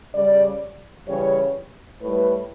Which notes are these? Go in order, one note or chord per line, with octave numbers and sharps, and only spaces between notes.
C#3 G3 D5
C#3 E3 G3 C#5
A2 G3 B4